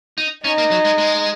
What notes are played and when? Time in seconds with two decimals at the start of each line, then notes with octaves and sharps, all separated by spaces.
0.18 D#4
0.44 C#4 D#4
0.58 A#3
0.71 F#3
0.85 G#3
0.98 G#3